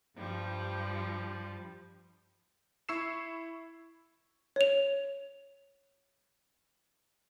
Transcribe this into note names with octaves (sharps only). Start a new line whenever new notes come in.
G2 F3 G3
E4 C#6 E6 C7 E7
C#5 F7